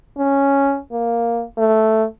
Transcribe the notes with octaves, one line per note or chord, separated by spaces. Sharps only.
C#4
A#3
A3